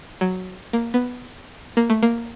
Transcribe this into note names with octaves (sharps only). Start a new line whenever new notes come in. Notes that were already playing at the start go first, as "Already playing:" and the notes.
F#3
A#3
B3
A#3
A3
A#3